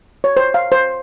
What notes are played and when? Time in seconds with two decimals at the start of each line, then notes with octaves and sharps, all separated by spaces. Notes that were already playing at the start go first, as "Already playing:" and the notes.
0.24 C#5
0.37 C5
0.54 F5
0.72 C5